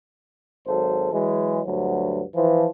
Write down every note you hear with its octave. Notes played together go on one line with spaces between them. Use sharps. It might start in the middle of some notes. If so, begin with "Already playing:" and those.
G#1 F#3 A4 C5
E3 F#3 G#3
D2 G2 F#3
E3 F3